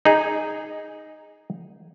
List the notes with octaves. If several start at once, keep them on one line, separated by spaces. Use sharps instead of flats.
D#4 G#4